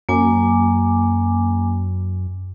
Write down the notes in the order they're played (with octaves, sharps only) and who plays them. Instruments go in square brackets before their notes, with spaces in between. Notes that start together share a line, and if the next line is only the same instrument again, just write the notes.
[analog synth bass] F#2 [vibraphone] A#3 G#5 D6